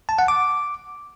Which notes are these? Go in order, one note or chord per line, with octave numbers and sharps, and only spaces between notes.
A5
F#5
D6